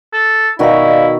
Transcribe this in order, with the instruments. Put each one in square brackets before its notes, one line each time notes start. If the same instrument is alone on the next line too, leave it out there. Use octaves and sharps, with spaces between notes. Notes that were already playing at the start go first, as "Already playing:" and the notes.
[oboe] A4
[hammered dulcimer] B2 D#3 F#4 [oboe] E4 [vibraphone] D5 D#5 F5